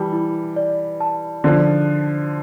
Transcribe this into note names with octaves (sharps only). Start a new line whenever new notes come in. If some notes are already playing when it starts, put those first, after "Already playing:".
Already playing: E3 G3 A5
E4
D5
A5
D3 F3 D5